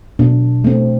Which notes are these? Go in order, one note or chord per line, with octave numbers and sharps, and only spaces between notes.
B2 D4
A3 C4